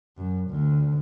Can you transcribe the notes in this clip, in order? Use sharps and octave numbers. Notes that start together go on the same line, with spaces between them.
F#2
D2